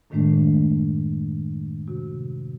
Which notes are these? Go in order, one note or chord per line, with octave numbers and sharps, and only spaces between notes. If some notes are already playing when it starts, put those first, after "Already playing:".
F#2 A2 D#3 G#3 A3 D4
C3 F#4